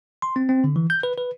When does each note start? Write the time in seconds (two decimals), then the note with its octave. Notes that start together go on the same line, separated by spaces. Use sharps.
0.22 C6
0.36 C4
0.49 C4
0.64 D3
0.76 E3
0.90 G6
1.03 B4
1.17 B4